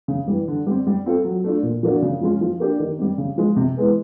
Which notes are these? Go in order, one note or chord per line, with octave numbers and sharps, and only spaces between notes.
C#3
E3 G3
D3
G3 C4
G3
C4 F4 A4
F#3
A3 D4 F4
A#2
F3 A#3 D4 F#4
C#3
F3 G#3 C#4 F4
F3
A#3 D4 G4
D#3
G3 C4
C#3
F3 G#3
C3
E3 G#3 B3